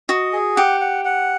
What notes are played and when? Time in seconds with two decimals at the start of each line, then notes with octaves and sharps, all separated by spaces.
0.09 F#4 D#5
0.33 G#4
0.56 G4 F#5
0.81 F#5
1.05 F#5